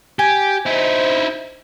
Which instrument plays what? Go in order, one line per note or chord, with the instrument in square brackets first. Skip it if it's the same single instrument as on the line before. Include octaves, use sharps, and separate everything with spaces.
[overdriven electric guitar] G4 [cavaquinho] G#5
[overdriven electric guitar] D#4 E4 [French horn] C5